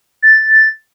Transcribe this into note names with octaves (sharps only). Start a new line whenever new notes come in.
A6